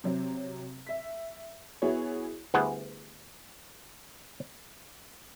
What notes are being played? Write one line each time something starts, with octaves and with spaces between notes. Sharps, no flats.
C3 F#3 C4
E5 B6
B3 E4 F#4 G#4 C#5
D2 G3 B3 E4 G#4 F#5